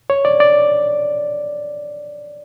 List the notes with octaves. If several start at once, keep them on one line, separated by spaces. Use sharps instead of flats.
C#5
D5
D5